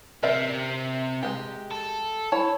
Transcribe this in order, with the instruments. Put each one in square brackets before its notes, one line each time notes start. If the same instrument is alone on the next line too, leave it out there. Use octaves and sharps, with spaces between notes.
[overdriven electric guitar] C3 [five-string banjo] A#4 D5 E5
[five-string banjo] G#3 G4
[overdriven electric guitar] A4
[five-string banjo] E4 C#5 A5